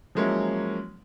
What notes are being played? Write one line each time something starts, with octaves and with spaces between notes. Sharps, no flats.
F3 F#3 G#3 A#3 C#4 E4